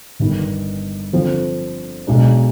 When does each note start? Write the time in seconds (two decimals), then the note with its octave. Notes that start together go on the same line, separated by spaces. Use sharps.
0.19 G1 G2 D#3
1.13 D3 F3 C4
2.07 B1 B2 G#3 D4